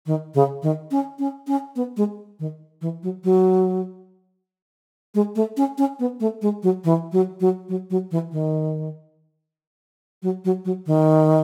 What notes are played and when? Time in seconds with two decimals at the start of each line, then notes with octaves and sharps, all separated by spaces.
0.06 D#3
0.35 C#3
0.62 D#3
0.91 C#4
1.19 C#4
1.47 C#4
1.76 B3
1.97 G#3
2.39 D#3
2.81 E3
3.03 F#3
3.24 F#3
5.15 G#3
5.36 A3
5.57 C#4
5.78 C#4
5.99 B3
6.20 A3
6.42 G#3
6.63 F#3
6.84 E3
7.12 F#3
7.40 F#3
7.69 F#3
7.90 F#3
8.11 E3
8.32 D#3
10.23 F#3
10.45 F#3
10.65 F#3
10.86 D#3